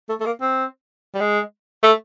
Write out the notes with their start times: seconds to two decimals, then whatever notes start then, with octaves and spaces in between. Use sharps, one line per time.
0.09 A3
0.20 A3
0.26 A#3
0.41 C4
1.15 G3
1.21 G#3
1.83 A3